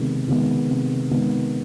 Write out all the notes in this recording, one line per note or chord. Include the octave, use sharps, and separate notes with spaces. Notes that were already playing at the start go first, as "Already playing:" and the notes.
Already playing: C3 D#3 G#3 B3
D#3 G#3 B3
C3
D#3 G#3 B3